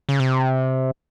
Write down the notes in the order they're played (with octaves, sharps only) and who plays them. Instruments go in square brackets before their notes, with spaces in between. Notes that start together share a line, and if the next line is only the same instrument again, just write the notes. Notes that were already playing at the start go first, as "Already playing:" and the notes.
[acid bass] C#3
C3